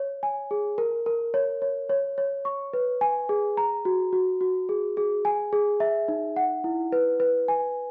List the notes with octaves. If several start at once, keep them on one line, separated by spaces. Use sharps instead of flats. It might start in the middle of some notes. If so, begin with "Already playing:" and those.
Already playing: C#5
G#5
G#4
A#4
A#4
C#5
C#5
C#5
C#5
C#6
B4
G#5
G#4
A#5
F#4
F#4
F#4
G#4
G#4
G#5
G#4
E5
D#4
F#5
E4
B4
B4
G#5